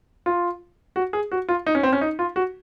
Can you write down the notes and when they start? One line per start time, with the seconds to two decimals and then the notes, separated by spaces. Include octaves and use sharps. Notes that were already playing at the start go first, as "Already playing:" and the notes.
0.26 F4
0.96 F#4
1.13 G#4
1.32 F#4
1.49 F4
1.67 D#4
1.75 C#4
1.83 C4
1.93 C#4
2.01 D#4
2.19 F4
2.36 F#4